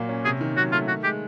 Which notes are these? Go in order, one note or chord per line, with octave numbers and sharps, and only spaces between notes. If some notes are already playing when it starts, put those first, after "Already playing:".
Already playing: A#2 F#3 A#3
C#4
C3 G#4
D#3
F#3 F#4
A3 F4
D#3 F#4
G#3 G4